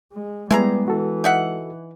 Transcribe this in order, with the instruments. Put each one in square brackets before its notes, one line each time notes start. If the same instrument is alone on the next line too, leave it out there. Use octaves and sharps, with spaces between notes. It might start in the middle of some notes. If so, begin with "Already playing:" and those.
[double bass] G#3
[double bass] G3 B3 [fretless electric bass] G#3 [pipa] E4 G#4 A#5 [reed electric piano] B4
[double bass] E3 [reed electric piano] F#4 A4
[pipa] D#4 E5 F#5